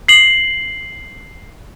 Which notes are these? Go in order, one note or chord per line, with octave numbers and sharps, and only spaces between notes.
C7 F#7